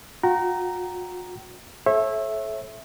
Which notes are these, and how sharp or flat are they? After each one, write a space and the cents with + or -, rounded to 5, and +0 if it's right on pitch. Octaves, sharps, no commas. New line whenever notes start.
F#4 -45 G5 -45 A#5 +0
A4 -30 C#5 -35 E5 +0